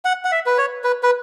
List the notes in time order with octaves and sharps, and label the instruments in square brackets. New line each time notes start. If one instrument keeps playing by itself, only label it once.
[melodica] F#5
F#5
E5
B4
C#5
B4
B4